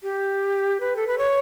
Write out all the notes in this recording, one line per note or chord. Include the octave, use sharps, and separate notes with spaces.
G4
B4
A4
B4
C#5